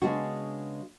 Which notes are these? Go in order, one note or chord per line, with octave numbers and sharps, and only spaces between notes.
C#3 G#3 B3 D4 F#4